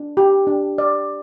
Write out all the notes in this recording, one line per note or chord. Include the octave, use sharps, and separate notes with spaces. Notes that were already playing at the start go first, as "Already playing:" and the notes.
Already playing: D4
G4
D4
D5